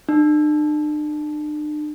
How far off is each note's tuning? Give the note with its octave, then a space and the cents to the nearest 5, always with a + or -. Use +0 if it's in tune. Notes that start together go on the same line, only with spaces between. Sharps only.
D4 +45